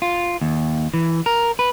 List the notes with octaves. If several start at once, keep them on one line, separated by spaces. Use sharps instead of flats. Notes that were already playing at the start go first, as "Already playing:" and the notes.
F4
D#2
E3
A#4
B4